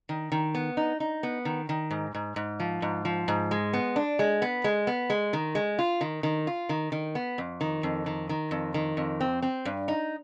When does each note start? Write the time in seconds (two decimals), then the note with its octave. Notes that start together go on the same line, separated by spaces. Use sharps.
0.09 D#3
0.32 D#3
0.55 B3
0.77 D#4
1.00 D#4
1.23 B3
1.45 D#3
1.69 D#3
1.91 G#2
2.15 G#2
2.36 G#2
2.60 F3
2.82 G#2
3.05 F3
3.28 G#2
3.51 G#3
3.73 B3
3.96 D4
4.19 G#3
4.42 B3
4.64 G#3
4.87 B3
5.10 G#3
5.33 D#3
5.55 G#3
5.79 F4
6.01 D#3
6.23 D#3
6.47 F4
6.69 D#3
6.92 D#3
7.15 B3
7.38 F2
7.61 D#3
7.83 F2
8.06 D#3
8.29 D#3
8.51 F2
8.74 D#3
8.97 F2
9.20 C4
9.42 C4
9.65 G2
9.88 D#4